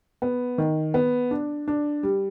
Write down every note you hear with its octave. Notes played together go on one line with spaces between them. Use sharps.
B3
D#3
B3
D4
D4
G3